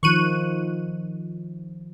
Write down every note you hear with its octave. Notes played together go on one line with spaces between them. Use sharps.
D#3 F3 C#6 F#6 D#7